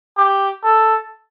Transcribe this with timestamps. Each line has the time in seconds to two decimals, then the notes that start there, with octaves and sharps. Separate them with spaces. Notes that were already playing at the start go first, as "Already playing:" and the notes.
0.17 G4
0.63 A4